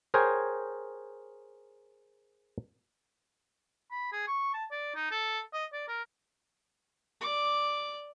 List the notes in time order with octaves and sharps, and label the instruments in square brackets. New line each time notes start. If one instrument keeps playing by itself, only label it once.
[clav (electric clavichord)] G#4 A#4 C5 C#5 G5 G#5
[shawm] B5
G#4
C#6
A5
D5
D#4
A4
D#5
D5
A#4
[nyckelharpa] D5 D6